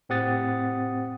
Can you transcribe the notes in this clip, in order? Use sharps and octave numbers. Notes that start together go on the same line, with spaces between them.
A2 C4 G4 F#5 D#6 A6